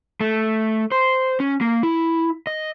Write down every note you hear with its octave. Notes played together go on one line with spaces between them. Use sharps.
A3
C5
C#4
A#3
E4
D#5